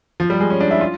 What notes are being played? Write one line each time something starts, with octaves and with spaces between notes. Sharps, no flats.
F3
G3
G#3
C#4
D4
E4
F4